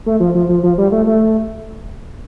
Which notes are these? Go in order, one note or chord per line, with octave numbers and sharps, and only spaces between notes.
A3
F3
F3
F3
F3
G3
A3
A3